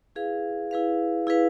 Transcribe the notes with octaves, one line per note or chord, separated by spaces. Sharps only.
E4 G#4 B4 F5
E4 G#4 B4 F5
E4 G#4 B4 F5